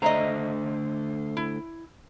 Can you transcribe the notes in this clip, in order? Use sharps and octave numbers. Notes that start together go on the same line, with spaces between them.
D3 A3 C5 D#5 E5 A#5
E4